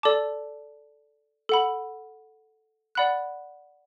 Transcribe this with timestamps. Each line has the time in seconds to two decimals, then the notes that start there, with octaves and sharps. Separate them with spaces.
0.03 A4 D5 A5 D6
1.49 A4 F#5 B5
2.95 D5 F#5 B5 F#6